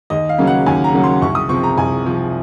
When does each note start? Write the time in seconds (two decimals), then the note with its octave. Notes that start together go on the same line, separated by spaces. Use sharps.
0.10 D#2 D#5
0.29 F5
0.38 C#3 F#3 A#3 C#4
0.47 F#5
0.66 D#2 G#5
0.84 A#5
0.93 C#3 F#3 A#3 C#4
1.03 C6
1.22 C2 C#6
1.35 D#6
1.49 C3 F3 C#6
1.63 A#5
1.78 C2 G#5
2.05 C3 F3